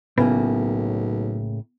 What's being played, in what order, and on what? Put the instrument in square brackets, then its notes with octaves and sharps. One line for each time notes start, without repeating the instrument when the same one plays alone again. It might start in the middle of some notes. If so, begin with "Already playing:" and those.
[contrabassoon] B1 [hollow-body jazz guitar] A2 C#3 A#3 [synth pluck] B3